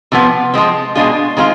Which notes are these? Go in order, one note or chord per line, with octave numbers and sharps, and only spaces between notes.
C3 F3 B3
F3 G#3 C4
B2 G#3 D4 F4 G#4
D#3 G#3 C4 F4